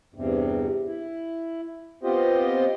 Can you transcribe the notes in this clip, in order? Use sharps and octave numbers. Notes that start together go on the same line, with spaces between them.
E2 G2 C3
E4
B3 C4 F4 G4 C5 D#5